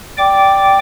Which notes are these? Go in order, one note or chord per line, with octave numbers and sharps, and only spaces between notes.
D5 G5 D6